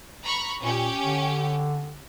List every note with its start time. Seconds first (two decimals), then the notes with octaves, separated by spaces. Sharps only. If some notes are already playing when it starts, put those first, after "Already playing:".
0.24 A#5 B5 C#6
0.62 A#2 C#4 G4
1.05 D3